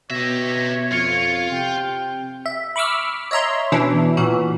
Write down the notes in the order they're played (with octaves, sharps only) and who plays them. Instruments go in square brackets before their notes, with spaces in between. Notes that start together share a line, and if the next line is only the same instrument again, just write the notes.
[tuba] B2 [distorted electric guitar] G4 E5 [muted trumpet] C#5 [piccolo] A#6
[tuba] F2 [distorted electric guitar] F4 [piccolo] C#7
[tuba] C3 [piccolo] G5
[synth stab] E5
B5 C#6 D6 E6 F6
C#5 D#5 E5 A#5 C6
B2 E3 C#4 D4 E4
A#2 E3 F#4